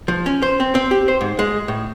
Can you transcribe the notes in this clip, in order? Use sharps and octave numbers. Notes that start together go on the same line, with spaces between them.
F3
C#4
C5
C4
C4
G4
C5
G#2
G#3
A2